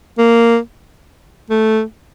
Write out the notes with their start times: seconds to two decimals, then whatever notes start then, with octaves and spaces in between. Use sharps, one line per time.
0.18 A#3
1.50 A3